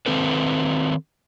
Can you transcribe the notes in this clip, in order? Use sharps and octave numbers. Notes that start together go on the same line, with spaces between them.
D#3 C4 A4 B4